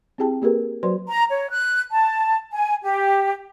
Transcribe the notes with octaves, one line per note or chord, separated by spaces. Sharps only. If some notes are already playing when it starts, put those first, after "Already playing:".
C4 E4 G4 G#4 G5 A5
A#3 G4 G#4 A#4 B4
F#3 F#4 B4 C5 D5 C6
A#5
C#5
F#6
A5
G#5
G4